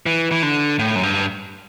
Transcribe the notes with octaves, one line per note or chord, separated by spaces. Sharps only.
E3
E3
D3
A2
F#2
G2